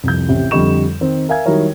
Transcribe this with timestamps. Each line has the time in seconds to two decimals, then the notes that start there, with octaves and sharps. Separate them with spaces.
0.04 C2 F2 G6
0.29 A1 C3
0.51 F2 D3 G3 D#5 C#6 E7
1.01 D#3 C4 D#4
1.29 A#4 E5 F5 G#5 G#6
1.46 D#3 F#3 G3 E4 A#4 C#5